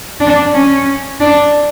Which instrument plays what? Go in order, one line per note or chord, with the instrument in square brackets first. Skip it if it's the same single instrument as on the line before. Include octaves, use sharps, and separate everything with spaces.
[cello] D4
C#4
D4